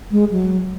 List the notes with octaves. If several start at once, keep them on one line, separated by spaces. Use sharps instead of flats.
G#3
F#3